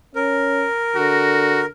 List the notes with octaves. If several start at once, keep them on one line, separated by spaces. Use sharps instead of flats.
C#4 A#4
D3 F#4